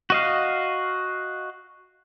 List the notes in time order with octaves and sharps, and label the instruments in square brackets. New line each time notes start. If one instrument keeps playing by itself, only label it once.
[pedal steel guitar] F#4 D#5 F5